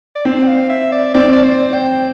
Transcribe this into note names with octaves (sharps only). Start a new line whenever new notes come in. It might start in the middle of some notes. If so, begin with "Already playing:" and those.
D5
C4 C5
G5
F5
E5
D5
C4 D5
D5
C5
G5